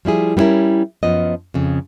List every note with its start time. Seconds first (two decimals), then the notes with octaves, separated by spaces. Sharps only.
0.05 F3 G3 E4 G#4
0.37 G3 B3 C#4 E4 A#4
1.03 F#2 F3 B3 D#5
1.54 F2 C#3